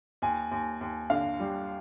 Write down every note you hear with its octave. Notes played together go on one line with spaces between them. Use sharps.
D#2 G#5
D#2
D#2
D3 F5
G3